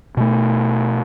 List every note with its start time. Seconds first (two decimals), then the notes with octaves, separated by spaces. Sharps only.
0.17 B2 A3